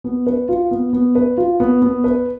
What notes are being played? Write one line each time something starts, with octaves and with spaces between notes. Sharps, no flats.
B3
B4
F4
B3
B3
B4
F4
B3
B3
B4